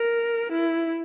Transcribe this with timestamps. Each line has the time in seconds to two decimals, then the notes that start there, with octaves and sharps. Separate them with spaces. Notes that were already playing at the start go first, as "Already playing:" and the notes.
Already playing: A#4
0.52 E4